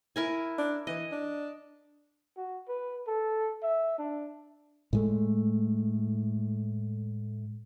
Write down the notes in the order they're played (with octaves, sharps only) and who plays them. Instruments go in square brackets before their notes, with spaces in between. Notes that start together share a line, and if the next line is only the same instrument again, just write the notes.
[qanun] E4 A#4 G#5
[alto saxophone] D4
[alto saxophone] E3 [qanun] D#5
[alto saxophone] D4
[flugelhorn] F#4
B4
A4
E5
D4
[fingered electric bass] A2 G#3 A3